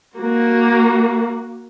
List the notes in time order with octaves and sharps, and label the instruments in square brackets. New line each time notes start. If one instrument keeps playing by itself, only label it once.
[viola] A#3 F#4